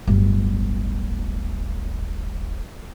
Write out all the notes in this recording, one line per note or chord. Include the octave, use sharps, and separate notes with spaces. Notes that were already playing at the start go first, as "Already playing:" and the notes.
D1 G1